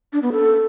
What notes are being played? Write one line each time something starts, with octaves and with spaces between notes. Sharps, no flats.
D4
B3
A4